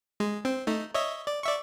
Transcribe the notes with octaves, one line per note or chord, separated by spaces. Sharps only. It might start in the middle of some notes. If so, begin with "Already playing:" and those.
G#3
C4
A3 D#4
C#5 D#5 E5
D5
D5 E5 C#6